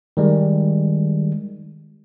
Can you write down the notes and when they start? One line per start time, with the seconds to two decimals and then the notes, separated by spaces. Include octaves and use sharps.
0.17 D#3 G3 G#3